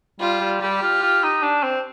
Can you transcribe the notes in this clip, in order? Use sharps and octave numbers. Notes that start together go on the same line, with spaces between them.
G3 F4
G3
G3 G4
F4
F4
D#4
D4
C4